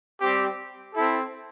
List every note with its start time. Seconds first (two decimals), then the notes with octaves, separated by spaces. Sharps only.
0.21 G3 C4 G4
0.94 C4 E4 A4